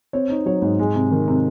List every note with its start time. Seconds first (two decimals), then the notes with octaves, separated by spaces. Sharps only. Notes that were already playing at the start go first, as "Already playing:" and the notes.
0.13 C4 C#5
0.30 D#4
0.46 F#3 C#5
0.62 G#2
0.79 G#3
0.95 C3
1.11 D#3
1.28 C3